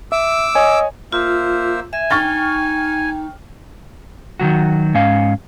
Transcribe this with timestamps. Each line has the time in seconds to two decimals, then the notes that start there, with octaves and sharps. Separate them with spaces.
0.12 E5 D6 E6
0.55 C#5 D#5 G#5
1.12 A#3 F4 C5 E5
1.93 E5 G#5
2.11 D#4 G5 C#6 F6 A6
4.40 D#3 E3 F#3 F#4
4.94 G#2 C#4 F5